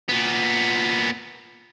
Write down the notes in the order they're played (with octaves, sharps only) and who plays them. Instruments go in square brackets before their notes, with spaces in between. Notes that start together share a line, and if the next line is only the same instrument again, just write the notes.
[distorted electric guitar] A#2 B3